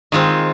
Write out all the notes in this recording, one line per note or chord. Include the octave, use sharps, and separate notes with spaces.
D#3 G#3 C4 F4